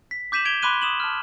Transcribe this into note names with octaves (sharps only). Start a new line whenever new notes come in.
B6
D6 G6 B6 D#7 E7 F#7
G#6 D7 F7 G7
B5 C6 D6 F#6 D#7 G7
D#6 E7 F#7
A5 F6